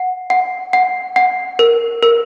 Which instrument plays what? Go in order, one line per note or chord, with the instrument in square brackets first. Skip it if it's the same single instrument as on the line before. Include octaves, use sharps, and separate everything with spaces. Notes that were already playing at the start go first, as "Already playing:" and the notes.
Already playing: [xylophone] F#5
F#5
F#5
F#5
A#4
A#4